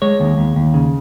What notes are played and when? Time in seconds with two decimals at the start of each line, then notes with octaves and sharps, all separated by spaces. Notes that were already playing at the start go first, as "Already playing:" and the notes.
0.02 G#3 C#5
0.20 D#2
0.38 D#2
0.56 D#2
0.74 C#3